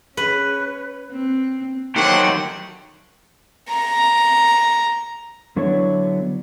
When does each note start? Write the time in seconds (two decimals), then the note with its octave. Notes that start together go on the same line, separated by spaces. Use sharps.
0.17 C#4 B4
1.11 C4
1.96 D#3 F#3 A3 G4 C5 F#5
3.70 A#5
5.56 D3 F#3 B3 D4 E4 C#5